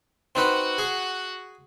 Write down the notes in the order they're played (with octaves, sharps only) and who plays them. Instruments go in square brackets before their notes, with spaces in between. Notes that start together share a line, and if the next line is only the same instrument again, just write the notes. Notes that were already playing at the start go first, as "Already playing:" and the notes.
[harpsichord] C4 D#4 B4 [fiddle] F#4 F#5
[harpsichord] G#4